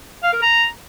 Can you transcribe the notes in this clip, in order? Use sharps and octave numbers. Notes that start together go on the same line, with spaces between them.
F5
A#4
A#5